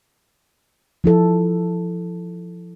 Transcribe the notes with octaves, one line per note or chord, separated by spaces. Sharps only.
F3 E4 A4